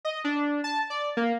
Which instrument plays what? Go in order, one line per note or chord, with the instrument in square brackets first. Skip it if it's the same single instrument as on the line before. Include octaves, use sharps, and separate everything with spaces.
[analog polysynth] D#5
D4
A5
D5
A#3